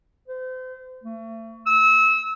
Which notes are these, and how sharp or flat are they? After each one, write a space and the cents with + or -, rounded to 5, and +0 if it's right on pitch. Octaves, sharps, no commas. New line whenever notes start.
C5 -35
A3 +35
E6 -30